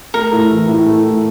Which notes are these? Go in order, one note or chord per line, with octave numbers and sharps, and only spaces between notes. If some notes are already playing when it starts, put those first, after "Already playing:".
A3 A#4
A2
E3
A2
A3
A2